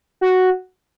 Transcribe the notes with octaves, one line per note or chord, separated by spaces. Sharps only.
F#4